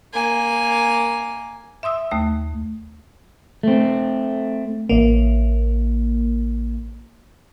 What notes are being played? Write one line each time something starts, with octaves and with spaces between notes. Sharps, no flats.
A#3 G#5
E5 C6 D#6 E6
D#2 A3 D#6
A3 C4
A1 A#3